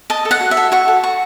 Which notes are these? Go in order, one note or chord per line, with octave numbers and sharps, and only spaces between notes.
D#5 A5
A4
F#5
F#4
E5
A4
F#4 C#6
A4
F#4 C#6